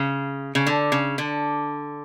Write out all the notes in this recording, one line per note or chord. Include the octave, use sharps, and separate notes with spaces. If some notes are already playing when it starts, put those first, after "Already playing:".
Already playing: C#3
C#3
D3
C#3
D3